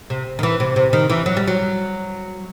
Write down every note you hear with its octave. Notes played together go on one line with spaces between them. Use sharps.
C3
D#3
E3
C3
C3
D#3
E3
F#3
G3
F#3